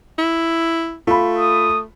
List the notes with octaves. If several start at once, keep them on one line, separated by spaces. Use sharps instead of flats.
E4
A3 F4 B5
D#6